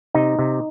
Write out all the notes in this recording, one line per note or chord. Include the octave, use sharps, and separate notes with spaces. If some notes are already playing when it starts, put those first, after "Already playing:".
C3 D#4
C3